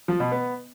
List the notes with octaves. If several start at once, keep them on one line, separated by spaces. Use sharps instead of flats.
F3
B2
B3